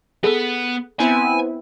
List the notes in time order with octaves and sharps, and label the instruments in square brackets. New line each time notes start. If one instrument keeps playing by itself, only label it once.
[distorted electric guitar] B3 [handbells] G#4 A4
[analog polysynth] B3 C4 E4 [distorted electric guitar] G#5